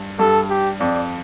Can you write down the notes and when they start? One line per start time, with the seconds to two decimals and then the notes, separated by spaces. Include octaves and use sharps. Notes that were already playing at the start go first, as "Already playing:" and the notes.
Already playing: G2
0.19 G2 A4
0.50 G4
0.80 F2 D5